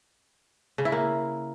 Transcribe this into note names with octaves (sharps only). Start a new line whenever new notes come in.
C#3
E4
A#3